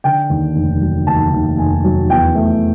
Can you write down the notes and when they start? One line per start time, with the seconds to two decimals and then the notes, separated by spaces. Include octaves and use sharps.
0.04 D3 G5
0.30 D#2
0.56 F1
0.81 F#3
1.07 D#2 A5
1.33 D#2
1.58 F1 G#5
1.84 F#3
2.10 E2 G5
2.35 A3